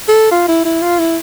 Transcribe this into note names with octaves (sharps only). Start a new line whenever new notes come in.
A4
F4
E4
E4
F4
E4